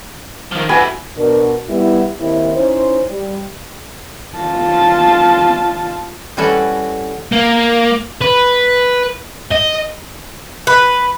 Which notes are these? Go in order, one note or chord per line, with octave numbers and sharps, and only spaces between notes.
D#3 F3
D3 E4 F#4 B4 G#5
B2 D4 A#4
G3 B3 E4
D#2 D#3 C4 E4
C#4 D#4 E4 C5
G3
F4 A5
E3 G3 C#4 F#4 A4 F#5
A#3
B4
D#5
B4